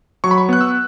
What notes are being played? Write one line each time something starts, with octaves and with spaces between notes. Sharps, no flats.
F#3 C#6
B5
C#6
B3 F#6
E6